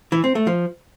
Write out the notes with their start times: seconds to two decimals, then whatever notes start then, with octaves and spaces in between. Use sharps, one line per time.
0.12 E3
0.24 C4
0.35 A3
0.47 F3